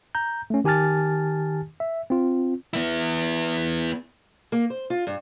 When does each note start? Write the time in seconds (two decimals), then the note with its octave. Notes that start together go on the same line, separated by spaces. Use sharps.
0.15 A#5 G6
0.50 A3 C#4
0.64 D#3 G4 G#5 A5 F6 A6
1.80 E5
2.10 C4 F4
2.73 B3 E4
4.52 A#3
4.70 C5
4.90 F4
5.07 G2